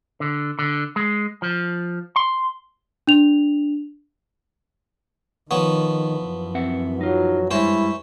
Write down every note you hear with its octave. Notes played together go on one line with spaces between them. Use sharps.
D3
D3
G#3
F3
C6
D4 F7
D#3 F3 B3 C#5
F#2 E3
C4 E5 F#5
F#3 D#4 F4
G2 G3 G#3 C#4 E4 C5 C#5